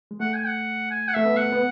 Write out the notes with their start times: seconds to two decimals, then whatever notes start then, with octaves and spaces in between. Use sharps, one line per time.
0.11 G#3
0.20 A3 F#5
0.34 G#5
0.47 F#5
0.91 G#5
1.08 F#5
1.14 A3 E5
1.25 B3
1.37 F#5
1.52 B3